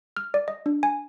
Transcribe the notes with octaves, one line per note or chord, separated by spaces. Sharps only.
F6
D5
D#5
D4
G#5